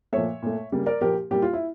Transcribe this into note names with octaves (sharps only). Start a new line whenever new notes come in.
A#2 F3 A3 C#5 E5
A#2 A3
C#3 G3 A#3
A#4 D5
A#2 F3 A#3 G4 A#4
A#2 G3 A#3 G4
F4
E4